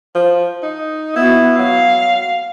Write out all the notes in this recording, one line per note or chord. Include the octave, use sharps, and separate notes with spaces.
F3
D#4
B3 E4 F#4
F#3 F5